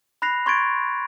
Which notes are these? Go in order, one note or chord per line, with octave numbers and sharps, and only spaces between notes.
B5 F#6 A#6 C7 F7
C6 C#6 G#6 A6 D7